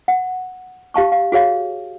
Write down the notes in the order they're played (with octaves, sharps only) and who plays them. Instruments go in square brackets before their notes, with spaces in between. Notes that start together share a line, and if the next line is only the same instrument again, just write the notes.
[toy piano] F#5
G4 F5 A5 C#6
F5
F#4 G#4 C#5 F5